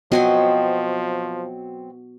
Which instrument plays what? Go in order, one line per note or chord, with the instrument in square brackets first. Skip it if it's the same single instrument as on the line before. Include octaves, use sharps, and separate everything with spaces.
[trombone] F3 [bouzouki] F#3 C4 [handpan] B3 F#4 [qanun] D#5 G#5